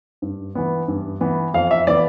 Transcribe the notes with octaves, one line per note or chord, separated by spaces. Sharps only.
G2
E3 B3
G2
E3 B3
F2 F5
E5
E3 B3 D5